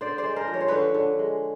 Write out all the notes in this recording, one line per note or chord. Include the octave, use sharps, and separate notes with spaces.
D3 C5 D5
C5 D5
G#3
A#4 C5
F3
C#5
C5
D3 B4 C#5
D3
G#3